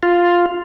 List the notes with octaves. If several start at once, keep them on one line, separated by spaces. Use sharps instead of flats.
F4